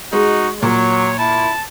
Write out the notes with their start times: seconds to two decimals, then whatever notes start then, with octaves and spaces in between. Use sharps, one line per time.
0.13 G#3 D#4 F#4
0.62 A#2 F#3 C#5
1.19 E4 A5